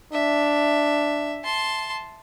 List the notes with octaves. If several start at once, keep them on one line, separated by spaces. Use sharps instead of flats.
D4 E5
A5 C6